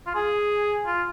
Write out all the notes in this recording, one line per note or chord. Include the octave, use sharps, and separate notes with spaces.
F4
G#4
F4